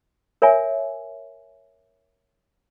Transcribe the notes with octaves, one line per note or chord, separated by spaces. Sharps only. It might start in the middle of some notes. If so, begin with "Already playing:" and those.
A#4 C#5 E5 G#5